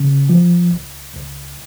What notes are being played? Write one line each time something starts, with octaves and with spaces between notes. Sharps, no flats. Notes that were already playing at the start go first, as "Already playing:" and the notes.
Already playing: C#3
F3
C#2
C#2